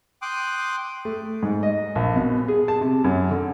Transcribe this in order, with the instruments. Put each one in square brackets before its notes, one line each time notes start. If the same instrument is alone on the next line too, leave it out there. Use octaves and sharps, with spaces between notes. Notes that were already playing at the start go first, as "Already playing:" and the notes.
[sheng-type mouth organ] G5 C6 D6 D#6 F#6
[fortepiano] A3
G#2
D#5
A#1
B2
G#4
A5
C3
F#2
D3